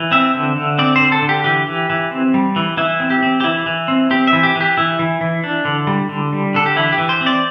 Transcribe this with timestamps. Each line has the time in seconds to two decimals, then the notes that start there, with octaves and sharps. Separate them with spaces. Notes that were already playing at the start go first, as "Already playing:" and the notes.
Already playing: E3
0.11 C4 E5
0.34 D3
0.57 D3
0.79 C4 D5
0.96 D3 C5
1.12 A4
1.22 D3
1.29 G4
1.44 E3 G4
1.67 E3
1.90 E3
2.11 C4
2.34 G3
2.56 E3
2.77 E3 E4
3.00 C4
3.10 G4
3.23 C4
3.40 G4
3.44 E3 E4
3.66 E3
3.88 C4
4.11 C4 G4
4.27 E5
4.33 E3
4.43 G4
4.55 E3
4.61 G4
4.78 E3 E4
4.99 E3
5.21 E3
5.44 D4
5.65 D3
5.87 G3
6.09 D3
6.33 G3
6.54 D3 A4
6.66 G4
6.76 E3 E4
6.92 G4
6.98 E3
7.09 C5
7.21 C4
7.26 D5